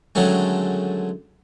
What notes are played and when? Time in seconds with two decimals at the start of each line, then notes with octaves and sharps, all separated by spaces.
0.15 D3 D#3 F#3 G#3 A3 C#4